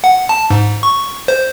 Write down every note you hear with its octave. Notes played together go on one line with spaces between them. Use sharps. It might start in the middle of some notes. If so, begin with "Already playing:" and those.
F#5
A5
G#2
C#6
C5